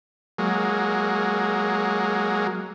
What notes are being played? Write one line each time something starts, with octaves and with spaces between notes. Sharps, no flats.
F#3 G#3 A#3